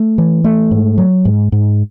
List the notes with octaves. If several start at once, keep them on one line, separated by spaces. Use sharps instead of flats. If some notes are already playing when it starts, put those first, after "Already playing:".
Already playing: A3
E3
A3
G#2
F#3
G#2
G#2